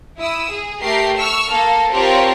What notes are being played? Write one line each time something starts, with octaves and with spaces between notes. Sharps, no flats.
E4 D#6 E6
G#4
A3 G4 A#4 C7
C#6 E6 F6
A#3 A4 F5
C4 F4 G4 A#4 C#5 A5